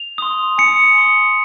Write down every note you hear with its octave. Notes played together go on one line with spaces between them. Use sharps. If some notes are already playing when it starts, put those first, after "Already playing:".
Already playing: F7
C6 D#6
G#5 C#7
C6 D#6